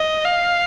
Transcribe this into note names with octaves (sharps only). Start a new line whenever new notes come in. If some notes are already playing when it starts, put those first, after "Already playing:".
Already playing: D#5
F5